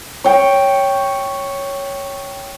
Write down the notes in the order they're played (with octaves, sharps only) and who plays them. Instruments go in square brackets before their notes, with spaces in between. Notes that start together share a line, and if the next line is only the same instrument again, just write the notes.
[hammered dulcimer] C#5 G5